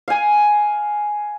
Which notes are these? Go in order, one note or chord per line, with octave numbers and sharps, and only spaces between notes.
F5 G#5